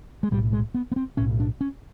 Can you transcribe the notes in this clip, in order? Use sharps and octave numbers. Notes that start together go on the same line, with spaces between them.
G#3
B1 A2 G3
G#3
B3
B3
C4
B1 A2 C#4
D4
C#4